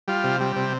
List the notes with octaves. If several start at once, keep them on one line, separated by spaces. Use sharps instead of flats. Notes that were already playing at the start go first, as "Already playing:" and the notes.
G3 F4
C3
G3
C3